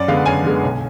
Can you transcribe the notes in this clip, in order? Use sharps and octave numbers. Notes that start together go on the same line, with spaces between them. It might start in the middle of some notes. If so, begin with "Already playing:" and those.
Already playing: F#2 D5
D3 G#3 B3 F5
F#2 G#5
D3 G#3 B3
B1